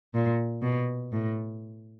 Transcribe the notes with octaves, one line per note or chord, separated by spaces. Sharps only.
A#2
B2
A2